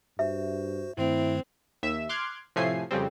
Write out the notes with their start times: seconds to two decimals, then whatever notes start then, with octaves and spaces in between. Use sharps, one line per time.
0.19 G2 F#4 C5 E5
0.98 G2 D#3 A3 C4 E4
1.83 D#2 E5 E7
2.09 C6 D6 F6 F#6 G#6
2.56 A2 C3 F3 A3 G#5 C7
2.91 F2 C#3 G3 C4